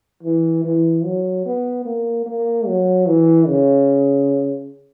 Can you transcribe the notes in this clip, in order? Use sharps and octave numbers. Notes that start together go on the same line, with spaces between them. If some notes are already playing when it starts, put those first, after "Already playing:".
E3
E3
F#3
B3
A#3
A#3
F#3
E3
C#3